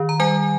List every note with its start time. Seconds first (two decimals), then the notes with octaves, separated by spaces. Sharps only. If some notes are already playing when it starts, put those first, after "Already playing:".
Already playing: D#3
0.09 A#5
0.20 G3 G#5